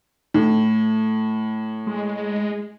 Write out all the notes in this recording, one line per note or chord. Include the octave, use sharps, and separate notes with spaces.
A2
G#3